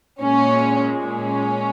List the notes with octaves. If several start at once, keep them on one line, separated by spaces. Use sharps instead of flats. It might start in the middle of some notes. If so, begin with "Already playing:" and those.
A#2 G#3 C#4
C#4